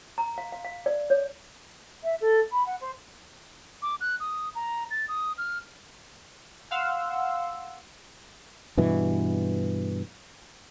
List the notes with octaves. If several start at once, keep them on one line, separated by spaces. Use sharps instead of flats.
A#5
F5
F5
F5
D5
C#5
E5
A4
B5
F#5
C5
D6
F#6
D#6
A#5
A6
D#6
F6
F5 F#5 C6 E6
G2 B2 E3